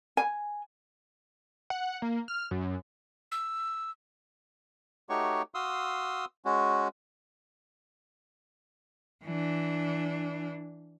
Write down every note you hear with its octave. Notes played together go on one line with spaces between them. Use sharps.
G#5
F#5
A#3
F6
F#2
E6
A3 D#4 F#4 G4 C#5 C#6
F#4 F5 C6 D#6 E6
G#3 C#4 F#4
E3 D4